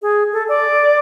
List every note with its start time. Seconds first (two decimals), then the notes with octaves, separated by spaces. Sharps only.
0.02 G#4
0.33 A4
0.48 D5